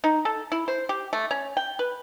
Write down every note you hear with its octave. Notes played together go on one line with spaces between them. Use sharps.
D#4
A4
E4
C5
G4
A3
C#4
G5
B4